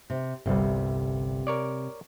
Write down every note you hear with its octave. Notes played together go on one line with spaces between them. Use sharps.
C3
G1 C2 C3 G3
A#4 C#5 D5